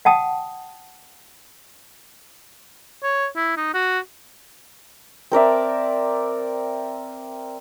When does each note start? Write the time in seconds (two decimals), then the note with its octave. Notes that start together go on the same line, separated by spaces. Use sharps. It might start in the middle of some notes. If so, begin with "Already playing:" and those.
0.05 F#5 G5 A5 D#6
3.03 C#5
3.36 E4
3.57 D#4
3.74 F#4
5.32 C4 A#4 D5 E5